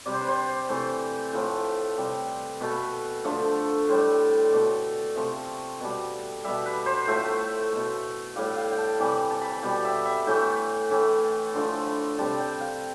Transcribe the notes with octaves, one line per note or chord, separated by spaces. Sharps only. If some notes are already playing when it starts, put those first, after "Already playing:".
C3 G3 D5
C5
B4
C5
C3 E3 A3 C5
A2 F3 A3 B4
C3 G3
B2 A3 B4
D3 F3 A3
A2 G3 C5
B2 A3 D5
C3 F3 A3 E5
B2 G3
B2 G3 E5
B4
C5
A2 F3 A3 E5
B2 A3
A2 G3 F5
F5
G5
A5
C3 E3 G3 B5
A5
B5
A5
B2 G3 G5
E5
E5
A2 E3 A3 G5
A2 E3 A3
D3 F3 A3 C6
B5
C3 G3 A5
G5
F5